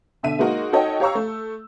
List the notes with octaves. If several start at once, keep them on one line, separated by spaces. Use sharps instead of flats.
B2 D3 E5 D#7
G#3 A#3 D#4 F#4 A#4
D#4 F#4 A4 C#5 D#5 G5
G4 C#5 F5 A#5 C#6 E6
A3